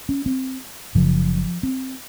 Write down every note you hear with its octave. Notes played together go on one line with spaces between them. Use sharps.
C#4
C4
F#1 F#2 C#3 F3
C4